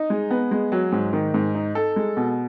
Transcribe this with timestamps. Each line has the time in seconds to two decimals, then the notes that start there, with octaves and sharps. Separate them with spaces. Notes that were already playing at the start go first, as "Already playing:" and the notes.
Already playing: D#4
0.10 G#3
0.31 B3
0.51 G#3
0.72 F#3
0.92 G#2
1.13 D#3
1.34 G#2
1.55 D#4
1.75 A4
1.96 G#3
2.17 B2